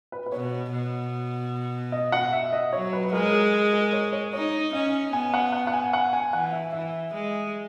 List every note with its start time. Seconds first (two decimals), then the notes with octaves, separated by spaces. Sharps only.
0.12 B4
0.26 B4
0.32 B2 C#5
0.72 B2
1.92 D#5
2.12 F#5
2.33 E5
2.53 D#5
2.73 F#3 C#5
2.93 B4
3.05 B4
3.13 G#3 A#4
3.32 G#4
3.73 A#4
3.93 C#5
4.13 C#5
4.33 D#4 C#5
4.73 C#4 D#5
5.13 B3 G#5
5.34 F#5
5.52 F#5
5.67 F#5
5.73 G#5
5.93 F#5
6.13 G#5
6.33 E3 F#5
6.53 E5
6.73 E3 E5
7.13 G#3